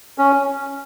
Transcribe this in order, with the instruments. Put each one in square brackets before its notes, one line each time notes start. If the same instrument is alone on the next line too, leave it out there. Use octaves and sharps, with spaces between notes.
[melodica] C#4